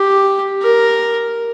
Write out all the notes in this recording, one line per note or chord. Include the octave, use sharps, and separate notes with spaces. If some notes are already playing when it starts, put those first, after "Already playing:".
Already playing: G4
A#4